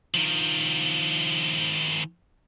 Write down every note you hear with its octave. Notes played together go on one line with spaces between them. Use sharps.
D#3 F3